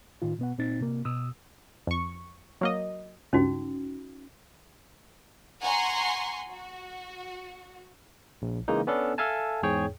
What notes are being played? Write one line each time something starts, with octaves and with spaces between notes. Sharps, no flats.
A2 D#3 F4
B2 B3 F#5
A#2 C4 D#4 A6
C3 A#3
B2 D#6 E6
F2 C#6
F#3 A#3 D#5
C#2 G2 C#4 D#4 F#4
F#5 G#5 A#5 C6 C#6
F#4
A#1
C#3 E3 G#3 A#3 D#4
B3 C#4 D4 A4
A4 E5 F5 G#5 A5
E2 G#2 G#4 C#5 G5